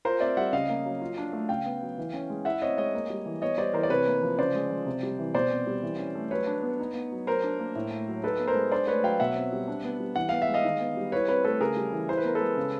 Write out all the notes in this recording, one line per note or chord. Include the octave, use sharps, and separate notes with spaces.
F4 A#4 C5
C4 D5 E5
G3 E5 F#5
C#3 D#5 F5
A#3
F#3
F4
D4
A3
C#3 F5 G5
B3
F#3
E3
C#4
G#3
E4 E5 F#5
C4 C#5 D#5
G#3 C#5 D#5
A#3
G3
E3
B3 C#5 D#5
G3 C5 D5
E3 A#4 C5
D5
C3 B4 C#5
A#3
F3
C#3 C5 D5
G#3
F3
C3
G3
E3
B2 C5 D5
C4
G3
E3
C#4
A3
F#3 B4 C#5
D4
B3
D#4
B3
F#3
F#3 A#4 C5
D4
A#3
A2
A3
F#3
D#4 A4 B4
B3
A#4 C5
G#3
D4 C5 D5
A3 B4 C#5
F#3 F5 G5
B2 E5 F#5
C4
G3
D4
B3
G3
E3 F#5
B3 F5
E5
G#3
D#5 F5
D#3
B3
G3
E4 B4 C#5
C4 B4 C#5
A3 A4 B4
C#3 G#4 A#4
G3
E3
E4 C5
B4
B3 A#4
A4 B4
G#3
C#3